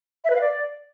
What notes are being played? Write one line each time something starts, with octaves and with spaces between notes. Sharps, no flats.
E5
B4
F5
D5